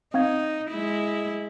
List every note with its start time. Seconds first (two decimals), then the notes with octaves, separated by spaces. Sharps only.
0.14 C4 D#4 F5 G#6
0.71 G#3 E4